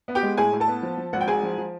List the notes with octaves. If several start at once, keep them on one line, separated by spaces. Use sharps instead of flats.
B3
G4 G5
G#3
A2 G#4 G#5
A2
A4 A5
B3
F3
F3
G#1 F#5
G5
G#2 G#4 G#5
F3
F3